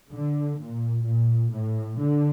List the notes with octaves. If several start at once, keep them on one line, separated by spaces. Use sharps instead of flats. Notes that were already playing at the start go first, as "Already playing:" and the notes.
D3
A#2
A#2
A2
D3